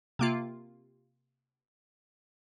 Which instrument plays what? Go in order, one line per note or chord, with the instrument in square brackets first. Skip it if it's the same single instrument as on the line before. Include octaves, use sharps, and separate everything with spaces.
[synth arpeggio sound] C3 A#3 F4